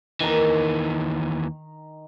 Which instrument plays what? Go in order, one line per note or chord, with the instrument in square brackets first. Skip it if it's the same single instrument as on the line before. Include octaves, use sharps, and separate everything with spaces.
[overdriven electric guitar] D#2 E3 [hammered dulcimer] D#3 A#5